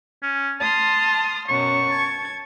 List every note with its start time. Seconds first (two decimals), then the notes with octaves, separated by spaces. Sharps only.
0.23 C#4
0.60 A5 C6 D#6 F6
1.49 F#2 B2 C#6
1.89 A5 G#6